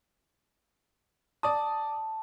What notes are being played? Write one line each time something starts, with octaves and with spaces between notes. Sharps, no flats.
D5 A5 D#6